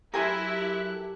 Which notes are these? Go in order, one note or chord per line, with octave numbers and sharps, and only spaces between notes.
F#3 E4 G4 A4 A#4 G#5 C6 F#6